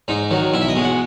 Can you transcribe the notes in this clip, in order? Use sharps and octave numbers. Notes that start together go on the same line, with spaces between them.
G#2 D#4
D#3 F#3
B1 E4
E5
D#5
B2 G#3
F#5